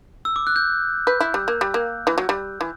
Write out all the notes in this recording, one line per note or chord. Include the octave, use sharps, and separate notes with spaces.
E6
D6
F#6
G6
B4 G6
E4
G3
A#3
G3
A#3
E3
F#3
G3
E3